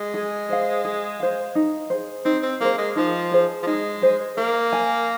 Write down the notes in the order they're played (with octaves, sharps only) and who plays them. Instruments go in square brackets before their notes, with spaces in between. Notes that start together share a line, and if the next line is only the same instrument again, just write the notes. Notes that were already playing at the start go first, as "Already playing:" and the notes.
Already playing: [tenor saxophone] G#3
[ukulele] G#4
C5 F5
G#4
C5 F5
D#4
G#4 C5
[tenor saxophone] C4 [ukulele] D#4
[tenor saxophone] C4
[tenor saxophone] A#3 [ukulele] G#4 C5
[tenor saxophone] G#3
[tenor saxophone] F3 [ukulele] D#4
[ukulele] G#4 C5
[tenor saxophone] F3
[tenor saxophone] G#3 [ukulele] D#4
[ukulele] G#4 C5
[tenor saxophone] A#3 [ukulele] A#4
[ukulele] G#5